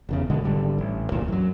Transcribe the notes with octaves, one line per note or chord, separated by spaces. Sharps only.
F1 E2 C#3
B2 D3 G#3
G#1 D3 G3
A1
D2 G2 A#2 E3
F#2 F#3